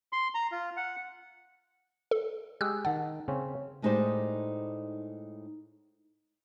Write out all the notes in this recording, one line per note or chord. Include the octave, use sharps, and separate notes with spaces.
C6
A#5
F4
F#5
A4
G#3 G4 D#5 E6 F#6
D#3 F#5 A5
C#3 C4 C#4
A2 G#3 D#4 G4 C5 D5